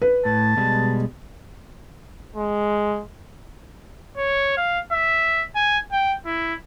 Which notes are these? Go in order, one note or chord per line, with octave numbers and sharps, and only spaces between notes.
B4
A2 A5
B2 G3 G#3
G#3
C#5
F5
E5
G#5
G5
E4